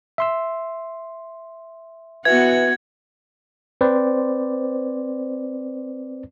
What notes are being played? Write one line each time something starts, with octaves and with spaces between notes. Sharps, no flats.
E5 C6 E6
E3 B3 F#4 G#6
C4 B4 C5 D5